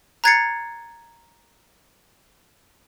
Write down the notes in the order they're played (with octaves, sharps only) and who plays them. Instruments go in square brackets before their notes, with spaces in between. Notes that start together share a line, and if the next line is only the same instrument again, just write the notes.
[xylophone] A#5 F#6 G#6 A6 C7 C#7